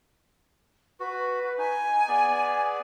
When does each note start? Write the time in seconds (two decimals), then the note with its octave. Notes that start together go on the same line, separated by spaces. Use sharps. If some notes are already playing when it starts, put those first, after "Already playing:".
1.00 F#4 B4
1.58 D#4 G#5
2.08 B3 G#4 D5